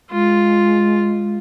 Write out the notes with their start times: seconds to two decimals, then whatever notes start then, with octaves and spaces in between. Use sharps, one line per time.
0.12 G#3 F4